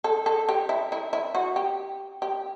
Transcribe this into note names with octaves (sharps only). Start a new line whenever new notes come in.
A4
A4
G4
E4
E4
E4
F#4
G4
G4